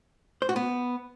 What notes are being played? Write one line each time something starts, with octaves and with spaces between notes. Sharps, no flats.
C5
F#4
B3